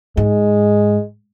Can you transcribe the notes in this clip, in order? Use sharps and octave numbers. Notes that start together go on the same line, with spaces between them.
G#2 G#3